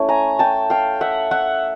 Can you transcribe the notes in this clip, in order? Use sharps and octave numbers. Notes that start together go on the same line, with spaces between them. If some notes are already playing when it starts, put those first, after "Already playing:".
Already playing: A3 C#4 E4
G#5 A#5
G5 A5
F5 G5
E5 F#5
E5 F#5